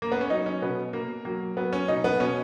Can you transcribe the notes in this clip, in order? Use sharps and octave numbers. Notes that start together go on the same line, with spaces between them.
A#3
B3
C#4
F#3 D#4
C#4
B2 B3
B2 A#3
F#3 A#3
F#3 B3
C#4
B2 D#4
B3
B2 C#4